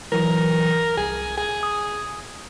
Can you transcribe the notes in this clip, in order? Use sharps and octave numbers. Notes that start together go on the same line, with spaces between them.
E3 F#3 A#4
C2 G#4
G#4
D#6